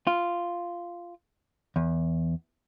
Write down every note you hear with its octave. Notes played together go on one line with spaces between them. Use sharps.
F4
E2